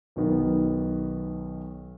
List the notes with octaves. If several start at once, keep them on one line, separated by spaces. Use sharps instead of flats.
B1 B2 D#3 B3